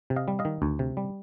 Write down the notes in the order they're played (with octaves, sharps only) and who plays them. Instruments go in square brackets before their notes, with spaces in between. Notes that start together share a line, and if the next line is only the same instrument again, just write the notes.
[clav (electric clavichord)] C3
D#5 F5
G3
D#5 F5
D#3
D2
C3
G3